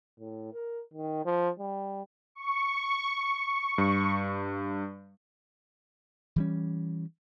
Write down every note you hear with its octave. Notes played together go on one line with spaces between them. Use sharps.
A2
A#4
D#3
F3
G3
C#6
G2
E3 G3 C#4